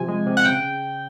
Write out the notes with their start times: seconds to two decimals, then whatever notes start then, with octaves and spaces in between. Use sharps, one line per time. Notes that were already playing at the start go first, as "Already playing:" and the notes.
Already playing: C3 F3 G#5
0.08 G#3
0.26 C3
0.37 F#5
0.45 C#3 G5